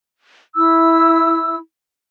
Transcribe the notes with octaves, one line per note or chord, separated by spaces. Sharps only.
E4 E6